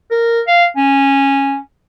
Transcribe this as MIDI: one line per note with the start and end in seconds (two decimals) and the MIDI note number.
0.11 0.41 70
0.47 0.65 77
0.77 1.58 61